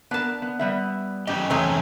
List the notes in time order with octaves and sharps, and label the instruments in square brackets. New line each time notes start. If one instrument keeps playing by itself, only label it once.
[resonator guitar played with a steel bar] B3 A#4 [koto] D4 A5
[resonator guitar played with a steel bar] B3
G3 B3 E5
[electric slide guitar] F#2 C#4 D#5 [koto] G4
[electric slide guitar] E2 C#5 A#5 [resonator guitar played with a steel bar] C3 A3 [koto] C4 C#4 G#4